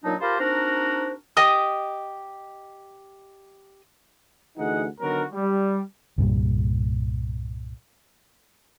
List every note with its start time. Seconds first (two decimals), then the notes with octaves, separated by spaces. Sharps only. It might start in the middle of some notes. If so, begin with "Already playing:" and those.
0.04 A#2 F#3 D4 D#4
0.21 F4 G4 A#4 C5 A5 B5
0.40 C4 D4 D#4 F#4 A#4 C5
1.37 G4 D#5 D#6
4.58 D2 E3 D#4 G#4 F#5
5.01 D3 D#3 F#3 B3 F#4 A#4
5.33 G3
6.18 C2 G2 A#2 G3